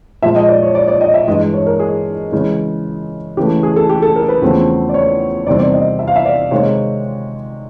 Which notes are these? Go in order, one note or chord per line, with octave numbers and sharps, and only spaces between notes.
A#2 F3 G#3 E5
D#5
D5
C#5
D5
D5
D#5
E5
G2 E3 G#3 D#5
C#5
A#4
G#4
C#3 E3 G#3 C#4
C#3 E3 A3 G4
G#4
A4
G4
A4
A#4
B4
E2 C#3 F3 A3 C4
D5
C#5
E2 C3 D#3 G3 C4 D5
D5
D#5
E5
F5
E5
D5
C3 D#3 G#3 C4 C#5